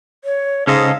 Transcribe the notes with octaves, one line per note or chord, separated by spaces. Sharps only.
C#5
G#2 C#3 C#4 A4 D#5 F5